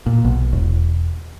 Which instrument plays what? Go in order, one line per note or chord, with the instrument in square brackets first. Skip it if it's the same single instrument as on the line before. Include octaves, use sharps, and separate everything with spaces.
[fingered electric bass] A#2
B1
E1